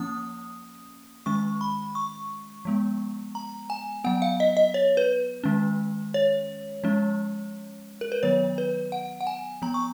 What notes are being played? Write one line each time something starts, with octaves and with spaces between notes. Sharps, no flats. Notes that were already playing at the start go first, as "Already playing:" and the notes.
Already playing: F3 A#3 C#4 D#6
D#3 G#3 C#4 C#6
B5
C#6
F3 G#3 B3
A#5
G#5
F#3 B3 F#5
F5
D#5
D#5
C#5
B4
D#3 G#3 C#4
C#5
F3 G#3 C#4
A#4
B4
D#3 F#3 B3 C#5
B4
F#5
F#5
G#5
F3 B3 A#5
C#6